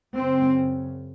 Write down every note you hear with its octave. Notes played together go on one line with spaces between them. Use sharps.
F#2 C#3 C4